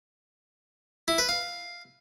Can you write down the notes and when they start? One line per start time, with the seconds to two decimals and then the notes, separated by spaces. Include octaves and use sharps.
1.08 E4
1.18 B4
1.29 F5